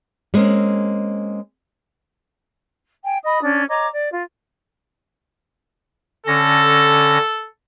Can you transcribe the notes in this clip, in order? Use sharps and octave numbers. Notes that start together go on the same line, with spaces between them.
G3 G#3 A#3 C4 C#4
G5 G#5
D#5 B5 D#6
C#4 D4
C#5 D#5 A#5 D6
D5
F4
D3 C#4 A4 A#6